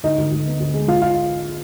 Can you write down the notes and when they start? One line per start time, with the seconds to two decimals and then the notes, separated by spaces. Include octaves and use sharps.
0.03 D2 D#4 D#5
0.18 D2
0.31 D2
0.46 B3
0.60 D2
0.74 G#3
0.88 A#1 F4 F5
1.02 F4 F5